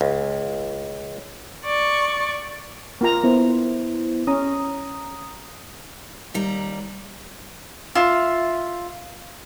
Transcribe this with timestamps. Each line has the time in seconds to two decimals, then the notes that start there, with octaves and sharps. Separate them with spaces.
0.01 C#2
1.66 D5 C#6
3.01 A#3 F4 A#5
3.23 B3 E4 C5
4.27 C#4 A#5 D#6
6.34 D#2 G3 A#5
7.95 F4 E5